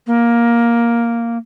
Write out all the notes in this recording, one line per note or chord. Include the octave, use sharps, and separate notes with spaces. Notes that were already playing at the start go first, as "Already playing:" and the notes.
A#3